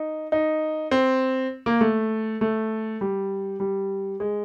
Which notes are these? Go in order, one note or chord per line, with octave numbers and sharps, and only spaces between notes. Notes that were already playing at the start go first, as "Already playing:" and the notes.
Already playing: D#4
D#4
C4
A#3
A3
A3
G3
G3
G#3